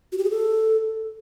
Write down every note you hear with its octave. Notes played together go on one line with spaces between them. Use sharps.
F#4
G4
G#4
A4